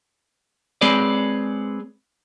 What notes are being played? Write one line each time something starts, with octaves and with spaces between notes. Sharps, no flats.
G#3 C4 G#4 B4 C#5 D5